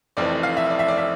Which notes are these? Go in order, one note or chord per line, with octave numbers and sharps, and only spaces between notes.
F1 F2 E3 D5
F5
E5
D5
E5
D5
E5